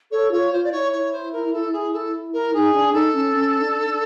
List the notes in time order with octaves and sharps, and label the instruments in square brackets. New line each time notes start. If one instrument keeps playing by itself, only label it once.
[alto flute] A4 [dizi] C#5
[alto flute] F4 [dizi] C#5
[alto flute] F4 [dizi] C5
[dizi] D5
[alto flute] E4 [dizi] C#5
[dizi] C#5
C5
A#4
A4
G#4
A4
A#4
[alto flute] D#4 [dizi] G#4
[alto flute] D4
[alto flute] D#4 [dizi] A4
[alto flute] C#4
C#4
D4
D4